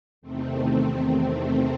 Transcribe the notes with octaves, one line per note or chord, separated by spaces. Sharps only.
E2 C3 D#3 A3 C4